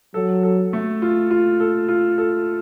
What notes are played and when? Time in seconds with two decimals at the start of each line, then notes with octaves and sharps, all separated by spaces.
0.14 F#3 A4
0.43 A4
0.73 A3
1.02 F4
1.31 F4
1.60 A4
1.88 F4
2.18 A4